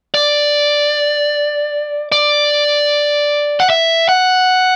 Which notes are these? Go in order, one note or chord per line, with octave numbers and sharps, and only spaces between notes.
D5
D5
F#5
E5
F#5